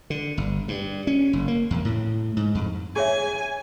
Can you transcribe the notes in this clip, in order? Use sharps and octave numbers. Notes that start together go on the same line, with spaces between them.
D3
G1
G2
C#4
F#1
A#3
E2
A2
G#2
F2
G#4 C#5 E5 G#5